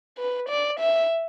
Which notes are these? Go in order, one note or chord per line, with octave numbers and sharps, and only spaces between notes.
B4
D5
E5